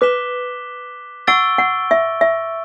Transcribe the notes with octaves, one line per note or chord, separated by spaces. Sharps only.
B4 D6 F#6 B6 E7 G7
F#5 C#6 E6 A6 D7 G7
F#5
E5
E5